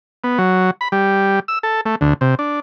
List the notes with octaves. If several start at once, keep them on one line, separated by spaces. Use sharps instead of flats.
B3
F#3
B5
G3
E6
A4
A3
D2
C3
D4